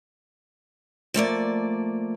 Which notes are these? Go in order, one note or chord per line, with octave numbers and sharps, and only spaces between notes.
F3 A3 A#3 D5